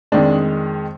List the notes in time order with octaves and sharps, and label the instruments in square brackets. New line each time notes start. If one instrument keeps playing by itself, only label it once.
[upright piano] F2 D#3 G#3 D4